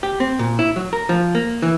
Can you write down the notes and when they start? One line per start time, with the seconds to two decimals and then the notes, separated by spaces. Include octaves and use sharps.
0.03 G4
0.20 C4
0.39 A#2
0.59 E4
0.76 F#3
0.93 A#4
1.09 F3
1.35 A#3
1.62 E3